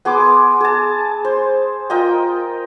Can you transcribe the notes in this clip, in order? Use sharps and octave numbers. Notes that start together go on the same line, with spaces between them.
B3 G#4 C6 D6
G#4 A5
C5
F4 A#4 D#5 G5